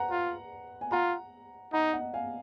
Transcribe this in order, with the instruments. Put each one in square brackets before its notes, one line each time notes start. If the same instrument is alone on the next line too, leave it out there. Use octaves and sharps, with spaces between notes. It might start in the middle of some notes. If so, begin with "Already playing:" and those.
Already playing: [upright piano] B4 F#5 A#5
[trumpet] F4
[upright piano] G#5
[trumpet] F4 [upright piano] F#5 A#5
[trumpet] D#4 [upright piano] F#5 A#5
[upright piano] D#5 F#5
F5 G#5